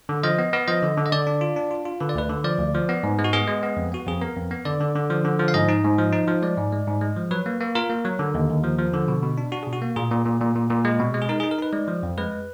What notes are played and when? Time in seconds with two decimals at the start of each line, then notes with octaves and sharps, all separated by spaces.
0.09 D3
0.23 F3 D#5
0.38 B3
0.53 B3
0.68 F3 D#5
0.83 D3
0.97 D3
1.06 D#5
1.12 D3 D5
1.27 D4
1.41 F4
1.56 D4
1.71 F4
1.85 F4
2.00 D3 B4
2.09 D5
2.15 D2 B4
2.30 D3
2.44 F3 D5
2.59 D2
2.74 F3
2.89 B3
3.03 G#2
3.19 G#3
3.24 F#4
3.33 B3 G#4
3.48 G#3
3.63 B3
3.77 F2
3.92 B3 F#4
4.07 F2 G#4
4.21 B3 A#4
4.36 F2
4.51 B3
4.65 D3 D5
4.80 D3
4.95 D3
5.10 F3
5.25 D3
5.39 F3
5.48 F5
5.54 G#2 D#5
5.69 D#4
5.84 G#2
5.98 F3
6.13 D#4
6.28 F3
6.42 G#3 D5
6.57 G#2
6.72 G#3
6.87 G#2
7.01 G#3
7.16 F3
7.31 F#3 B4
7.46 A#3
7.61 A#3
7.75 F4 A#4
7.90 A#3
8.05 F#3
8.19 D3
8.34 D#2
8.49 D#2
8.64 F3
8.78 F3
8.93 D3
9.08 B2
9.22 B2
9.38 D4
9.52 D4 F#4
9.63 B2 G#4
9.73 F#4
9.82 A#3
9.96 A#2 G#4
10.11 A#2
10.26 A#2
10.41 A#2
10.55 A#2
10.70 A#2
10.85 G#3
10.99 B2
11.14 G#3
11.22 G#4
11.29 D#4 A#4
11.40 G#4
11.43 D#4
11.51 A#4
11.59 D#4 B4
11.73 G#3 D5
11.88 F3
12.03 F2
12.18 G#3 B4